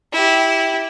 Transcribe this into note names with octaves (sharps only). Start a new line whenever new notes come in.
E4 G4